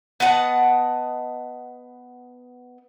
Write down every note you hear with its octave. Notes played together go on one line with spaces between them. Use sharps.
B3 D#5 F#5 A5